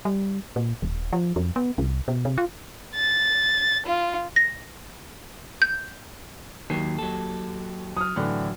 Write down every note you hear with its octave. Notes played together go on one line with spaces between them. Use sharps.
G3
A#2
D#1
F3
F2
B3
C2
B2
C3
F4
A6
F4
A#6
G6
D#2 D#3 F#3 C7
F#3 A4
F#3 D#6 F6
A2 D3 E3 F#3